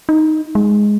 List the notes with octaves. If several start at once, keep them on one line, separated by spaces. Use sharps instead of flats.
D#4
G#3